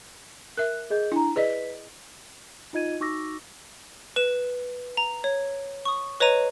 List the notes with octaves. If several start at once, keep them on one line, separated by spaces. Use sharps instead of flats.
A#4 E5 F#6
G#4 D#5 G6
D4 E4 A#5
G#4 B4 D5 D#5 B6
D#4 F4 D#5 G#6 D#7
D#4 F#4 C#6 D6 E6 A#6
B4 E7
A#5
C#5
C#6 D#6
B4 C#5 D#5 A#5 D#7